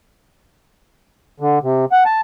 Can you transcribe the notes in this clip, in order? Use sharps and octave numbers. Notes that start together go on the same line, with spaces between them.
D3
C3
F#5
A5